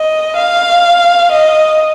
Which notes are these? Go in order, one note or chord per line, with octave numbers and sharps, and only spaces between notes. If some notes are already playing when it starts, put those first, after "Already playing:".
Already playing: D#5
F5
D#5